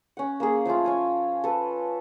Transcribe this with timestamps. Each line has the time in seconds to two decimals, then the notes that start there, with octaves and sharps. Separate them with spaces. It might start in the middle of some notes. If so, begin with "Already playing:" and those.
0.17 C#4 F#5
0.40 A#3 G#4
0.65 F3 A3 C#4 F4
0.85 C#4 F5 G#5
1.44 A4 B4